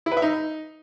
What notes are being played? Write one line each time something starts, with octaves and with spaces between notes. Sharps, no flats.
E4
B4
E5
D#4